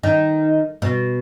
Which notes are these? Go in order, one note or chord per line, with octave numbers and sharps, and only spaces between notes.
D#3
B2